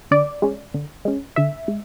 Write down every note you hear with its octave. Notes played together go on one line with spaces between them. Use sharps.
D3 D5
G#3 C#4
D3
G#3 C#4
D3 E5
G#3